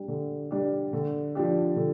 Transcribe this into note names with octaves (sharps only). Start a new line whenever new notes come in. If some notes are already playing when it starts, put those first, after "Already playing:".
Already playing: G3 D4 G4
D3
G3 D4 G4
D3
F3 D4 G4
D3